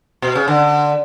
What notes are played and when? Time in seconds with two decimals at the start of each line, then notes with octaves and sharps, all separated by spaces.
0.22 B2
0.35 C#3
0.48 D3